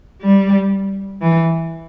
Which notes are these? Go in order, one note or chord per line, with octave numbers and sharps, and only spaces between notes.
G3
E3